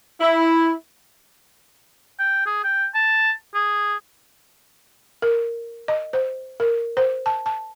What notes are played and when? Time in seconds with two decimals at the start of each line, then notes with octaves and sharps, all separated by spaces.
0.21 E4
2.19 G5
2.46 G#4
2.64 G5
2.94 A5
3.54 G#4
5.22 A#4
5.88 D#5
6.13 C5
6.60 A#4
6.97 C5
7.26 A5
7.46 A5